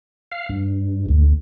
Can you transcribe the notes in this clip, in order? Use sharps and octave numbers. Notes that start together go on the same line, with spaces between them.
F5
G2
D2